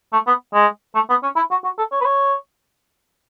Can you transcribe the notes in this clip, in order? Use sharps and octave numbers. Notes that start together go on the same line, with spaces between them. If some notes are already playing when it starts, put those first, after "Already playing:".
A3
B3
G#3
A3
B3
C#4
E4
F#4
F#4
A4
C#5
B4
C#5